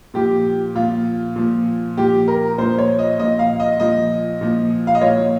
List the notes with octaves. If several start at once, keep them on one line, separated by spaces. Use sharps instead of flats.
A#2 F3 G4
A#2 F3 F4
A#2 F3
A#2 F3 G4
A#4
A#2 F3 C5
C#5
D#5
A#2 F3 D#5
F5
D#5
A#2 F3 D#5
A#2 F3
F5
D#5
A#2 F3 C#5